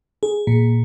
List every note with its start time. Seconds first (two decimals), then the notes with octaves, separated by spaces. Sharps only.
0.23 G#4
0.47 A#2